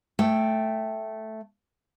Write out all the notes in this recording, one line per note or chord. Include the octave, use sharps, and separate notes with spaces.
A3 G5